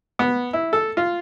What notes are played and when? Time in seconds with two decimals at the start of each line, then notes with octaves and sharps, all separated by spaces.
0.19 B3
0.53 E4
0.73 A4
0.97 F4